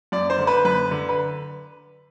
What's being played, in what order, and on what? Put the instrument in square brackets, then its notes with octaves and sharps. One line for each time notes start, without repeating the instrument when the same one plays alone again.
[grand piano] F#2 D5
C5
D3
B4
F#2 B4
D3
B4